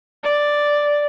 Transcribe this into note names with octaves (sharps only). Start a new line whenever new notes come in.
D5